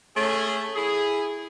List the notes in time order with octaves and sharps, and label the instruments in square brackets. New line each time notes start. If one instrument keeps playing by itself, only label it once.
[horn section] A3 C#4 G#4
E4 G#4